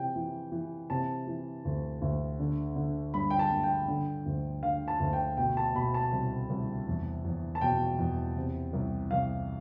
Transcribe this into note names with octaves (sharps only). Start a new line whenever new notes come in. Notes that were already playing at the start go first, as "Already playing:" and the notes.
Already playing: C3 E3 G5
E3
E3
C3 A5
E3
D2
D2
D3
D3
G2 B5
G5
A5
G2
G5
D3
D2
D3 F5
A5
D2
G5
B2 G5
A5
B2 B5
A5
C2
C2
E2
E2
A5
B2 G5
E2
C3
C2
C2 F5